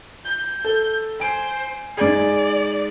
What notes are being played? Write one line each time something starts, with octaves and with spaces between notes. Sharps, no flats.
G6
A4
C5 G#5 D7
G#2 G#4 D5